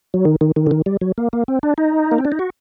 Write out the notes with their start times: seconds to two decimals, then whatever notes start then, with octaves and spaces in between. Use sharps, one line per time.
0.14 F#3
0.25 D#3
0.41 D#3
0.56 D#3
0.67 D3
0.71 D#3
0.86 G3
1.01 F#3
1.18 A#3
1.33 A#3
1.48 C4
1.63 D4
1.78 D#4
2.11 A#3
2.18 C4
2.25 D4
2.32 D#4
2.39 F#4